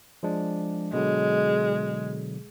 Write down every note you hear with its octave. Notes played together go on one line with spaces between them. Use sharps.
F3 G#3 D4
B2 D3 F#3 G#3